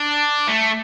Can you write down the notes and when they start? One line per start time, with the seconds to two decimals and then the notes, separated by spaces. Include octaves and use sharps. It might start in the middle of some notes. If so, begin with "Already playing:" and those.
Already playing: D4
0.48 A3